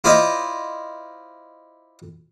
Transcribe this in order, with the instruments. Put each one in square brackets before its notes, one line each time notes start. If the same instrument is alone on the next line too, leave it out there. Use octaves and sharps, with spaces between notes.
[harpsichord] E4 F4 C5 D5 D#5